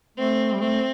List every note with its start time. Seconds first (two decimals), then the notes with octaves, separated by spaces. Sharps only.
0.18 A3 C4
0.53 G3
0.60 A3 C4